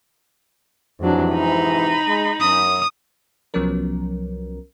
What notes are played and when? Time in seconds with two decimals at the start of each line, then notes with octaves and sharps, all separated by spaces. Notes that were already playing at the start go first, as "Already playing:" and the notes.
1.00 F2 G#2 C3 E3 F#3 D4
1.32 D#4 B5
2.07 G#3 D#5
2.41 F#2 D#6
3.54 C2 F3 F#3 B3 C#4 A#4